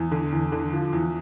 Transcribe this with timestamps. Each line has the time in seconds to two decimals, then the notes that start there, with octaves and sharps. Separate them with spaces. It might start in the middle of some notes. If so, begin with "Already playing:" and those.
Already playing: E2
0.11 D3
0.32 E2
0.52 D3
0.73 F3
0.93 E2